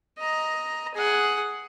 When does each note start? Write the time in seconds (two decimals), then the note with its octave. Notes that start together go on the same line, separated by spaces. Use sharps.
0.18 D#5 A#5
0.94 G#4 F#5